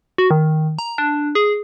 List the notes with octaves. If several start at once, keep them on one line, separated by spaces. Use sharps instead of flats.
F#4
D#3
A#5
D4
G#4